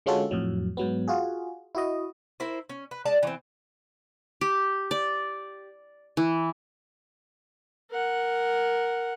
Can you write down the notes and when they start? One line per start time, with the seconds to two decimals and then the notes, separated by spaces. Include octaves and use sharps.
0.06 D3 G#3 C#4 F4 F#4 A4
0.31 F2 A2 F#3
0.77 G#2 F#3 B3
1.08 F4 F#4 G#4
1.75 E4 F#4 D#5
2.40 E4 A#4 C5
2.69 C#4
2.91 B4
3.05 G#3 D5 A5
3.23 E3 C4
4.41 G4
4.91 D5
6.17 E3
7.91 A#4 F#5